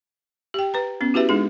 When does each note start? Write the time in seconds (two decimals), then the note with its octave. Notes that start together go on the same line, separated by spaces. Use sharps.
0.54 G4 G5
0.74 B4 A#5
1.01 B3 C#4
1.14 E4 F#4 G4 B4 E5
1.29 G#3 D4 D#4 G#4